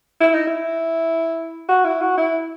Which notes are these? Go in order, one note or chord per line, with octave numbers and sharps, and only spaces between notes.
E4
D#4
E4
F#4
E4
F#4
E4